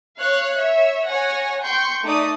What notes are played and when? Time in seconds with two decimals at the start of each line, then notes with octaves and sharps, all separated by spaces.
0.19 C#5 F5 F#6
0.56 C#5 E5
1.06 C#5 F#5 G#5 A#6
1.63 G5 C6 C#6 G6
2.03 A3 D#4 D5 D#6